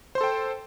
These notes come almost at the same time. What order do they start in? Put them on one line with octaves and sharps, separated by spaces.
C5 C6 A4 G5